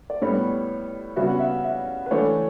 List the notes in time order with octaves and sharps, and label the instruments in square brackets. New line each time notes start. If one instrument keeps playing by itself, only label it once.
[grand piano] D5
[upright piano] A2 G3 B3 [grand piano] C#5
[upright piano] C#3 G3 B3 F#4 [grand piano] E5
[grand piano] F#5
E5
E5
B4
[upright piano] E3 A3 D4 [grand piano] C#5